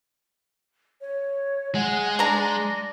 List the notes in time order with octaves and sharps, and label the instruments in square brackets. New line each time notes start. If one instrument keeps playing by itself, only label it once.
[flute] C#5
[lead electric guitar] G#3 [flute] F#5
[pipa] D4 A#5 [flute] A#6